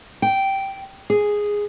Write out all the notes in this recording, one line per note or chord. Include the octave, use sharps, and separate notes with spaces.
G5
G#4